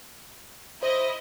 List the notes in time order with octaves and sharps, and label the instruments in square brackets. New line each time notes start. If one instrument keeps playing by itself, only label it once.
[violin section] E4 D#5 [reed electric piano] C5